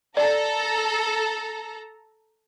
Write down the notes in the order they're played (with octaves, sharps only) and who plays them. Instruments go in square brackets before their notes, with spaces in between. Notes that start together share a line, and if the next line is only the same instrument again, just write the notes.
[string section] A4 A#5 [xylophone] D5